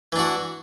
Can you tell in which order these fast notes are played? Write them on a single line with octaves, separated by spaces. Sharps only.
E3 D4 F#4